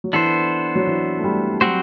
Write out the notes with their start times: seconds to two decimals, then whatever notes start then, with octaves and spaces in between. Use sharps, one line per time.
0.04 F#3
0.13 E3 B3 D4 A4 C5
0.75 F#3
0.87 E3
1.19 A3
1.24 G3
1.61 F#3 G3 C4 F#4 C5